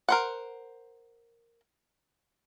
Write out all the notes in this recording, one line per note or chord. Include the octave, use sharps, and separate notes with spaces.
A#4 C5 F#5